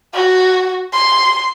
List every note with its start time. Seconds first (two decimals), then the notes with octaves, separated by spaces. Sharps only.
0.13 F#4
0.93 C6